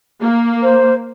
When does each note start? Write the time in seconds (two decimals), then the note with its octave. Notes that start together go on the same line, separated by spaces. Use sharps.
0.20 A#3
0.63 C5